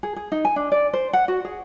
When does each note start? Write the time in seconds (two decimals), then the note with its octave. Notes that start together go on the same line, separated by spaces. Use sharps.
0.03 G#4
0.16 G#4
0.32 D#4
0.45 G#5
0.56 D4
0.72 D5
0.93 C5
1.13 F#5
1.28 F#4
1.45 G#4